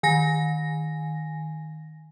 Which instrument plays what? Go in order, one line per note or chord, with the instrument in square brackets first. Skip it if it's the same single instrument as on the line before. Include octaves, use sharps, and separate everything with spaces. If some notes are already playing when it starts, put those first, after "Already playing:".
[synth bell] D#3 G#5 A#6